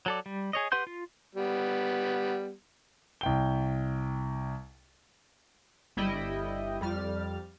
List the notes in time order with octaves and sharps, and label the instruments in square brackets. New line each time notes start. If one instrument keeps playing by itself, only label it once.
[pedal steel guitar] F#3 A4 D5
G3
G#4 C#5 D#5
G4 B4 F#5 C6 G6
F4
[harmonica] G3 B3
[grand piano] C2 G5 G7
[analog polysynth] G1 G3 E4 D#5 G5
F2 G3 F6 A6